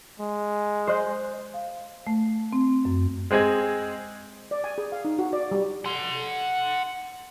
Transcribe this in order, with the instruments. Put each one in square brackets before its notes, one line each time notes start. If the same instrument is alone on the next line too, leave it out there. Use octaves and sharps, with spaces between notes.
[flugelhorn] G#3
[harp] C5 D#5 F#6
[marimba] F5
A3
C4
F#2
[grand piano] G#3 C4 G#4 D#5 G#6
[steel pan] D5
G#5
G#4
F5
D#4
F#4
D5
G3
[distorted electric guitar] F#5 C6